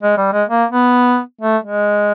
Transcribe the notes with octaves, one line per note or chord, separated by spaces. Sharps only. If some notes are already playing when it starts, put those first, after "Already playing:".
G#3
G3
G#3
A#3
B3
A3
G#3